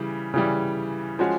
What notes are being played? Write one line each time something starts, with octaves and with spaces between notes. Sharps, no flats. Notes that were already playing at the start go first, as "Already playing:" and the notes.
Already playing: C#3 E3 G3
C#3 E3 G3
F3 G#3 C#4 F#4